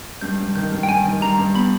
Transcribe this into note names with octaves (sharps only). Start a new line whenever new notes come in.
G2 G6
G2
D#3 G6
G2
G5
G2 G#5
D#3
G2 A#5
G2
B3 B5